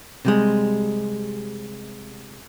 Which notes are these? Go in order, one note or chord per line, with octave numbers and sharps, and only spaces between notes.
C3 G3 G#3